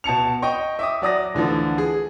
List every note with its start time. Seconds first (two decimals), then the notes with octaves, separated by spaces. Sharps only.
0.04 B2 A5 C#7 F7
0.42 D#5 G5 C#6
0.79 E5 D6 D#6
1.02 F#3 D5 D#6 A#6
1.34 D2 D3 E3 F3
1.78 G#4